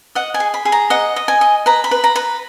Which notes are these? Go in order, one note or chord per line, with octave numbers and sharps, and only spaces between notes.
D#5 F#5
G#5
G#4
B5
G#4
A#5
D#5 F#5
D#5
G#5
D#5
B4 A#5
B5
B4
A#5
B4